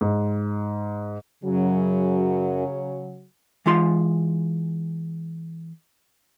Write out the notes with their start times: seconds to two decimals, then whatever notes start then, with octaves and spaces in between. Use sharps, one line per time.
0.01 G#2
1.44 F#2 C#3 F#3
3.66 E3 G#3 F4 C6